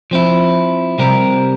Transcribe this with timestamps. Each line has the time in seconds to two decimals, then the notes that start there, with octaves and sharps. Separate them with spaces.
0.11 F3 C4 E4
0.98 C3 G3 C4 G4 A#4